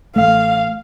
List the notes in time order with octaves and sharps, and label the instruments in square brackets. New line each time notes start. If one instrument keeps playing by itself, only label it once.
[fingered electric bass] A1 A3 [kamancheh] F5